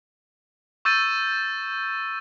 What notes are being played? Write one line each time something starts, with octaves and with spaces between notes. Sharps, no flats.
C#6 E6 G6 A6 D#7